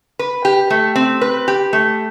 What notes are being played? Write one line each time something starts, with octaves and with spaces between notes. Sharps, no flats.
B4
G4
A3
C4
B4
G4
A3